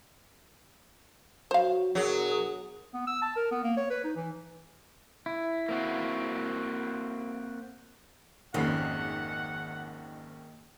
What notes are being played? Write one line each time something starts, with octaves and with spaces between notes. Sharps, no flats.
F#3 F#4 C5 F5
B2 F#3 D4 G#4 A#4
B3
E6
A5
A#4
B3
A#3
C#5
B4
D#4
E3
E4
A#3 C4 F#4
G#1 F2 D#3 A#3 C#4 G#4 F#5 C7